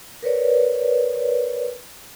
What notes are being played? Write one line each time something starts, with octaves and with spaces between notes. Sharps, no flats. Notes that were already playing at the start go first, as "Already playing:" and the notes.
A#4 B4 C#5 D5